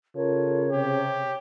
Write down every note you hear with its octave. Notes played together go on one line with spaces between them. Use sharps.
C#3 F4 A4 A#4 C#5
C3 G4